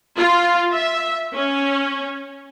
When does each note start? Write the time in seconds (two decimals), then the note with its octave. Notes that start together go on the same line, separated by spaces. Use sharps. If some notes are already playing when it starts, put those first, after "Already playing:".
0.18 F4
0.72 E5
1.34 C#4